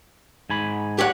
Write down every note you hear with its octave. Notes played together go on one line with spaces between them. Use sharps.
G#2 G#5 B5
G4 C#5 F#5